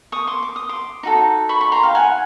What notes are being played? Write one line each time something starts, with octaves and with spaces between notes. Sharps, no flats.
C#6 D#6
C6 D6
D6
D#6
C6 D6
D#4 F#4 A4
B5 C#6
B5 C#6
A#5 C6
F5 G5
F#5 G#5